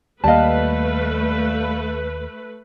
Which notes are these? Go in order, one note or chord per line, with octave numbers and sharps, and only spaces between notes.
D#2 G3 A3 A#3 B4 D#5 F5 A5